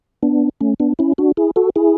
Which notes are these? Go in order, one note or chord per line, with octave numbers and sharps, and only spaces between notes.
B3 D4
A3 C#4
B3 D4
C#4 E4
D4 F#4
E4 G#4
F#4 A4
E4 G#4